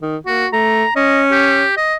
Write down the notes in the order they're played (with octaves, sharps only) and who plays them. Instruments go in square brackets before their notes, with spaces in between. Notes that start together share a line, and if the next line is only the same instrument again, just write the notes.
[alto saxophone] D#3
[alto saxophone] A#3 [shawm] F#4
[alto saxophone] A3 [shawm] A#5
[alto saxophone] C#4 [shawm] D#5
[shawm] G4
D#5